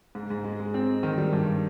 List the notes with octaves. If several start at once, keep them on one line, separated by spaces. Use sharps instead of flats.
G#2
G#2
G#3
G#3
C4
G#3
D#3
G3
G2